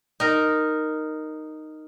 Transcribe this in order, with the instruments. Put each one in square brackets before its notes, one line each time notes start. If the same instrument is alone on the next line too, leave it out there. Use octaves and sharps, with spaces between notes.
[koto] D#4 A#4